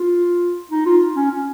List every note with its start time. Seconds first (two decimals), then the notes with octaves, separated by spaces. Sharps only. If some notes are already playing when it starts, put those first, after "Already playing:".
Already playing: F4
0.71 D#4
0.86 F4
1.16 C#4
1.31 C#4